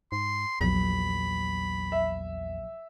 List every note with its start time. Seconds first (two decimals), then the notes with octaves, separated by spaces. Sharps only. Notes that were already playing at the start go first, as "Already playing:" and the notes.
0.12 G#2 C6
0.61 A#1 E2 F#3 B5
1.92 E5